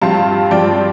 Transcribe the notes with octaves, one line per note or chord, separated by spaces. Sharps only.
G2 F3 C4 F4 F5 A5
G2 F3 C4 F4 D5 G5